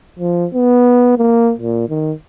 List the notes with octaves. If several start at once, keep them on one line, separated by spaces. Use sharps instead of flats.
F3
B3
A#3
A#2
D#3